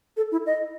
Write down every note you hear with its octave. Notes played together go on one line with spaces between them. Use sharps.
A4
E4
D#5